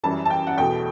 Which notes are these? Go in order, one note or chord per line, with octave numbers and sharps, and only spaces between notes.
F#2 E3 G3 A5
A5
G5
F#5
E2 B2 A3 G5